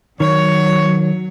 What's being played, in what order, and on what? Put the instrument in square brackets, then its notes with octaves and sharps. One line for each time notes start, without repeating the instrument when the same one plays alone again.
[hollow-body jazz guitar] D#3 [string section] F#3 [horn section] C#5